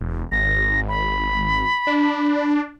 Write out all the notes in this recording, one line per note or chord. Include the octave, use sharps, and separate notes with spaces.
E1
G#1 A#6
B5
D4